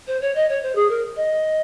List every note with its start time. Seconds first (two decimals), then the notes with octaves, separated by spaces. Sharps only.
0.07 C5
0.21 C#5
0.35 D#5
0.49 C#5
0.63 C5
0.75 G#4
0.90 A#4
1.16 D#5